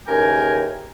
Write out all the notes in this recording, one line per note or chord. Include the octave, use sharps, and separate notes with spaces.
D#2 C#3 E3 A#4 G5 G#5